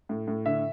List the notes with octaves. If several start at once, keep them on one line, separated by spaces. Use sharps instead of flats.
A2
A2
D3 E5